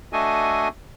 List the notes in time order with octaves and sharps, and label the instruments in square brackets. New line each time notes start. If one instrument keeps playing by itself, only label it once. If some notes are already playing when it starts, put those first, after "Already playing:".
[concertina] A3 D4 F#4 A4 D#5 G#5